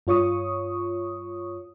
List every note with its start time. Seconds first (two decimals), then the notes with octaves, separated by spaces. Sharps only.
0.07 G2 F4 C#5 C#6 D#6